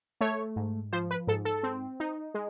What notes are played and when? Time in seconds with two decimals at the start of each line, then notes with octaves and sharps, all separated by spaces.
0.21 A3 C#5
0.56 G#2
0.93 F3 C5
1.11 B4
1.27 G#2 A4
1.45 A4
1.63 C4
2.00 D#4
2.34 G#3